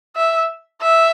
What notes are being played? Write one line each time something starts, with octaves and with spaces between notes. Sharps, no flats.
E5
E5